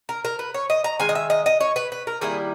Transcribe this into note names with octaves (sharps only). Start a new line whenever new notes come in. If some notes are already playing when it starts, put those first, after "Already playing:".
A#4
A#4
B4
C#5
D#5
A#5
D#3 G#3 G#5
D#5
E5
D#5
D#5
C#5
B4
B4
A#4
D#3 G3 A#3 E4 G#4